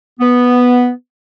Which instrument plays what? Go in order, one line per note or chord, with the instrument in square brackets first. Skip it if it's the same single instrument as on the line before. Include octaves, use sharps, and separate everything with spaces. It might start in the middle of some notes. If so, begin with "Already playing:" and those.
[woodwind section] B3